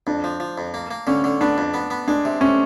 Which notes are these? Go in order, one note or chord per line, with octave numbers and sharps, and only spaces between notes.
F2 D4
F3
F3
F2
A#3
A#3
D3 C#4
D3
B3 D4
F2
B3
B3
G#3 D4
C3
C3 C#4